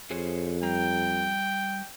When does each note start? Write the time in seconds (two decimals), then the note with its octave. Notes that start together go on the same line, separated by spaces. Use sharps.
0.11 F2 G#4 C5 C#5
0.63 G3 G5 A#5